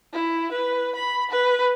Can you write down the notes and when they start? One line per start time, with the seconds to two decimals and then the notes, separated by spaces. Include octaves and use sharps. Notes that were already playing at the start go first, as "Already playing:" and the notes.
0.13 E4
0.52 B4
0.96 B5
1.31 B4